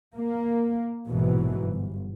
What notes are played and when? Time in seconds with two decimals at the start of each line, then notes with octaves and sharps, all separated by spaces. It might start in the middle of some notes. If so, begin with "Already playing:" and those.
0.17 A#3
1.09 A#1 G#2 B2 E3 F#3
1.61 G1